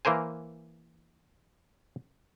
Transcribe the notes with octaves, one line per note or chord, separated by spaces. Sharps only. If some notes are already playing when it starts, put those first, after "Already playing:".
E3 A#3 A#4 C5 G#5